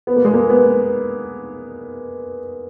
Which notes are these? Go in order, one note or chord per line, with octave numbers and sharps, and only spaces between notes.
B3
A#3
G#3
A#3
B3